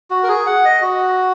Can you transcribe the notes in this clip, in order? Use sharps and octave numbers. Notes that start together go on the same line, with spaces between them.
F#4
A#4
G#4
F#5
D#5
F#4